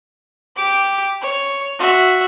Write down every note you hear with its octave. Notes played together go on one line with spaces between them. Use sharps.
G4 D6
C#5
F#4 E5